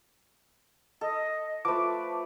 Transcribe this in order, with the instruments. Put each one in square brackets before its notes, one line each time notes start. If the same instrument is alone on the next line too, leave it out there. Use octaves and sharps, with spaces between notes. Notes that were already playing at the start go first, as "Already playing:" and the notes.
[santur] A4 [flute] D#5
[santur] F3 A3 [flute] B4 [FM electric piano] D6